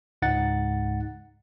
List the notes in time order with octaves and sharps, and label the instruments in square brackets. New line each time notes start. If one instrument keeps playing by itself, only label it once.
[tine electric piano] C#2 G#2 D#4 F#5 A6